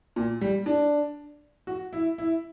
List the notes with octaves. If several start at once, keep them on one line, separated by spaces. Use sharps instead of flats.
A#2
G3
D4
F#4
E4
E4